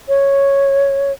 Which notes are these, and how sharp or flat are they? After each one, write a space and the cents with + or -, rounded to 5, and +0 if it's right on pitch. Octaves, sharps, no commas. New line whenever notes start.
C#5 -5